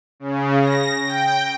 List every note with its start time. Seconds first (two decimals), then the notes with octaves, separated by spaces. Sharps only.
0.20 C#3
0.61 A#6
1.05 G5